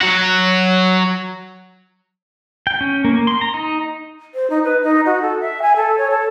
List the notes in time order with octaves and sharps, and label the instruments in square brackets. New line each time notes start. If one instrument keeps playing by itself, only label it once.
[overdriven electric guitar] F#3 F#4
[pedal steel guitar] G5
C#4
A#3
C6
A#5
D#4
[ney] C5
D#4
B4
D#4
F#4
A4
E5
G#5
A4
C#5
A4